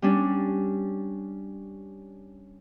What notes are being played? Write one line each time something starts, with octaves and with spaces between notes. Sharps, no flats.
G3 C#4 D4